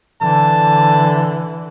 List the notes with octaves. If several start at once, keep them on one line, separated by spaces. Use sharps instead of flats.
D3 E3 A5